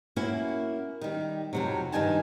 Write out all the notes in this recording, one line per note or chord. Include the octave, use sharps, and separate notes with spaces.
A#3 C#4 E4 F#4
D#3 G3
F2 C3 F#3
G2 D#3 D4 D#4 G#5 A5